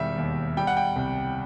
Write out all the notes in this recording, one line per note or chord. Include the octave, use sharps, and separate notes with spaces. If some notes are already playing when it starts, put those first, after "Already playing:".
Already playing: E1 D#3 G3 E5
D#2
G3 G5
F#5
G5
C2